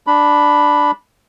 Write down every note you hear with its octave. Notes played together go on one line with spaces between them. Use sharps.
D4 B5